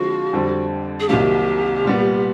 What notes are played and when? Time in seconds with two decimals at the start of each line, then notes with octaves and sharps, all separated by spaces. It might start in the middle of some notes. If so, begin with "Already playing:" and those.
Already playing: D3 F3 G#3 C4 F4 F#4
0.33 F2 D3 G3 C4
1.00 G#4
1.09 C2 C3 D#3 F#3 A#3 G4
1.85 A#2 G3 B3